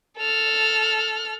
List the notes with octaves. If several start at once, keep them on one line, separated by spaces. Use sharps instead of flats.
A4 F6